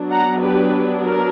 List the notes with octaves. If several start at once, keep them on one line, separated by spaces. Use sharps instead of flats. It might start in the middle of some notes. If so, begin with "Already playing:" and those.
Already playing: F#3 B3 D4
F#5 A#5
G4 B4
A#4